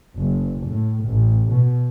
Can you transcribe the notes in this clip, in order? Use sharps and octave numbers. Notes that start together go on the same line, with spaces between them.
F#1
A2
A1
B2